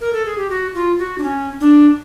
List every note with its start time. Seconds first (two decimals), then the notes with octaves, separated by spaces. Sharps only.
0.00 A#4
0.13 A4
0.26 G#4
0.38 G4
0.50 F#4
0.75 F4
0.99 F#4
1.18 D4
1.23 C#4
1.61 D4